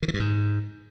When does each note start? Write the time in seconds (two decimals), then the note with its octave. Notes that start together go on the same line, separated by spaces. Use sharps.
0.02 D#3
0.08 E3
0.14 G2
0.20 G#2